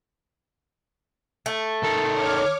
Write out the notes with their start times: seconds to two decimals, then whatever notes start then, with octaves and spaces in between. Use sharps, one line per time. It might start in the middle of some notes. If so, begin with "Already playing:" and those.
1.46 A3
1.83 D#3 A4
2.14 C#5 D6 F6